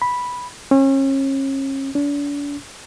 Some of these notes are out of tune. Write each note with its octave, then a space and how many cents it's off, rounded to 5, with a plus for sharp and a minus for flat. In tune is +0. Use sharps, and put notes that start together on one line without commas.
B5 -5
C#4 -35
D4 -40